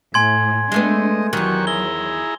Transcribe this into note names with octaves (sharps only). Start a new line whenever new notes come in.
A2 G#5 C6 G#6
G#3 A3 B3 D4 D#5
E2 D#3 F#3 F#4 G4 C#6
E4 G#4 A#5 G7